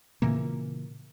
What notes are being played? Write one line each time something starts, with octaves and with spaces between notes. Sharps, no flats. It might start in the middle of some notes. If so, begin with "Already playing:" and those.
A#2 C#3 E3 A#3